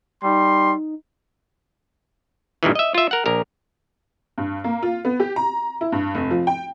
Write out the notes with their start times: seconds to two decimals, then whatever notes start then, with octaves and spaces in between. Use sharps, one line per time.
0.23 G3 D#4 C6
2.63 G2 A#2 D#3 E3
2.75 D#5 E5
2.94 F4 E5
3.11 A#4 F#5
3.26 A#1 A#4
4.38 G2
4.64 A#3
4.83 F4
5.05 B3
5.20 G4
5.36 A#5
5.81 E4
5.92 G2
6.15 F1
6.31 F3
6.47 G5